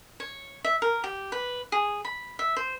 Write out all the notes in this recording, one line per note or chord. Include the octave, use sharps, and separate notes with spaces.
C#5
E5
A#4
G4
B4
G#4
B5
E5
C5